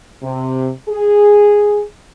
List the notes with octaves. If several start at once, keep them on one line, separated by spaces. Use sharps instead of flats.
C3
G#4